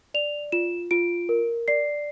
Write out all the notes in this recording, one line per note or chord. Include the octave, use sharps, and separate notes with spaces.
D5 F7
F4 E7
F4 D7
A#4
D5 C7